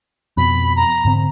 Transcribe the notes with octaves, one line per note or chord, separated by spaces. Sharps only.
F2 B2 B5
A#5
G#2 D3 C4